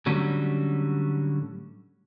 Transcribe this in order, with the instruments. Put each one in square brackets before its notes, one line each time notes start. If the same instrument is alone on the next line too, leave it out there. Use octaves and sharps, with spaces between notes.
[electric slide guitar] A2 D3 F#3 G3 C#4